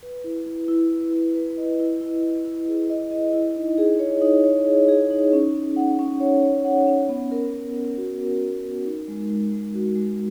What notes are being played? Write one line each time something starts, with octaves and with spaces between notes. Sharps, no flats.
B4
E4
E4
E4
B4
E4
B4
D#5
E4
E4
E4
E4
G#4
D#5
D#5
E4
D#4
G#4
C#5
D#4
C#5
G#4
G#4
D#4
C#4
C#4
F#5
C#4
C#5
C#5
F#5
C#4
B3
A#4
B3
A#4
F#4
A#4
B3
A#4
D#4
G#3
G#3
G#3
F#4
G#3